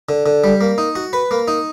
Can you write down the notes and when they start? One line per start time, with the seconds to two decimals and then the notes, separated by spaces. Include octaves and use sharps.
0.09 D3
0.26 D3
0.44 G3
0.61 A#3
0.78 D#4
0.95 F#4
1.13 B4
1.31 A#3
1.48 D#4